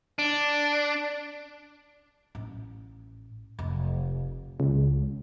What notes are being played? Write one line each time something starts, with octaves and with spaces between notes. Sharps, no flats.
D4
A1
F1
C#2